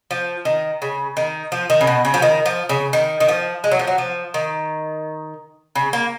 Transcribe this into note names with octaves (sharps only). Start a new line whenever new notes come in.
F3
D#3
C#3
D#3
F3
D#3
C#3
B2
C#3
F3
D#3
F3
C#3
D#3
D#3
F3
G#3
F#3
F3
F#3
F3
D#3
C#3
A#3